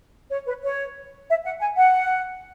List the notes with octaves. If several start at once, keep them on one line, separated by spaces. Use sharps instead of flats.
C#5
B4
C#5
E5
F#5
G#5
F#5